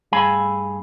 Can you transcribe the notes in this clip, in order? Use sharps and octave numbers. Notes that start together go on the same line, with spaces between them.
G2 A3 G#4 F5 G#5 B5